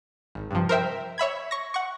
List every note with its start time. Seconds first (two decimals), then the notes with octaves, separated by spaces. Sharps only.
0.35 G#1
0.51 G2 C3 F3
0.69 A#4 C5 E5 G5
1.18 C#5 E5 B5 G#6
1.51 C#6 A#6
1.74 F#5 C#6